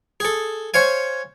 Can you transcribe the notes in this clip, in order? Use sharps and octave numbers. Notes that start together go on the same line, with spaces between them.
G#4 A4
C5 C#5 F5 G#5